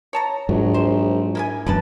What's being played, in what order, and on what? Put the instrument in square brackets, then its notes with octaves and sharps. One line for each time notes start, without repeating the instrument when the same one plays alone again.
[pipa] C#5 A5 A#5
[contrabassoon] A#1 [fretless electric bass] G#2 F#3
[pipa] C5
A#3 E4 G#5
[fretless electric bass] E1 F#2 [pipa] D3 B4 A5